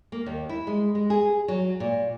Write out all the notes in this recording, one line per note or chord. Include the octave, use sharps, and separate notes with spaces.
A#3
D#2
E4
G#3
G#3
G#4
F#3
A#2